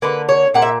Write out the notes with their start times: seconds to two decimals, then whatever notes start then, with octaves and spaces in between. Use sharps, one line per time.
0.02 D3 A#3 B4
0.29 C#5
0.54 A#2 A#3 F#5
0.62 E5